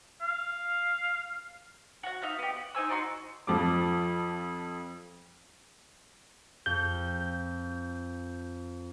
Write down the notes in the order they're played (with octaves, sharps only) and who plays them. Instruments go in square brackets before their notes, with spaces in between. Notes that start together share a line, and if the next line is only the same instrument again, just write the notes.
[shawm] F5
[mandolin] F#4 F#5
D#4 E5 F5
B3 G4
F#5
D#4 C5 G#5 E6
D4 D#4 F#4 C6
[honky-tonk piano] F2 F3 D6
[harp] F2 [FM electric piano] G6